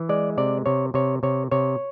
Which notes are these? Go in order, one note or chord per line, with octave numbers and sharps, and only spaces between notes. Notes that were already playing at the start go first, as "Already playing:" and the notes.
Already playing: E3
G#3 D5
C3 D5
C3 C#5
C3 C#5
C3 C#5
C3 C#5